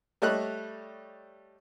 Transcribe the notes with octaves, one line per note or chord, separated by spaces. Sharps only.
G3 A3 C#5 D#5 F#6